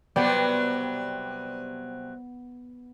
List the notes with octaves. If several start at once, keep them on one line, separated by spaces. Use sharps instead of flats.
C3 F#3 G3 B3 D5 G5